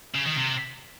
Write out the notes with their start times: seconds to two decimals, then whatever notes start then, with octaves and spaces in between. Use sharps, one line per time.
0.15 C#3
0.26 D#3
0.37 C3